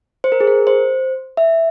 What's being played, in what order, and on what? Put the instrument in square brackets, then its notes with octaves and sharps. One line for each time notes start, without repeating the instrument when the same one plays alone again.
[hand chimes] C5
A#4
G#4
A#4
C5
E5